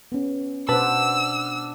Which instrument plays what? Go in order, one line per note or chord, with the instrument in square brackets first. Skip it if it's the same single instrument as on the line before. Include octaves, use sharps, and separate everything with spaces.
[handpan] B3 C#4
[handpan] B2 C5 [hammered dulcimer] D4 D5 F#5 [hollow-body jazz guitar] B4 A5 [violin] E6